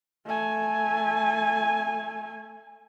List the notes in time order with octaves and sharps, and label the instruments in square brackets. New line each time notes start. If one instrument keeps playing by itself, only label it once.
[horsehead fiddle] A3 G#5